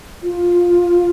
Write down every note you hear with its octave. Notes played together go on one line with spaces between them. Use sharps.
F4